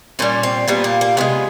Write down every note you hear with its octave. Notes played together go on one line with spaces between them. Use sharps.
A#2 G3 C#4
C4
A#2 G3 B3
A#3
A#3
C3 E3 G#3 B3